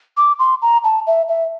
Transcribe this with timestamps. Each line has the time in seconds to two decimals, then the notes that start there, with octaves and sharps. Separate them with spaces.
0.17 D6
0.39 C6
0.62 A#5
0.84 A5
1.07 E5
1.29 E5